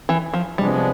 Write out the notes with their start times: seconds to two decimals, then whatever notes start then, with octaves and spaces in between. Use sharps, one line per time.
0.09 E3
0.34 F3
0.58 C3 F3 G3 G#3 B3 D4